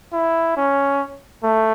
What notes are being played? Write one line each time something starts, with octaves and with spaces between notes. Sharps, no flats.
E4
C#4
A3